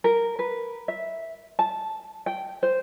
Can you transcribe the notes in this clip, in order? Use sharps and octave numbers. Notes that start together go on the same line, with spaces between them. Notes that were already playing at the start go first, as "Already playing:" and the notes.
A#4
B4
E5
A5
G5
C5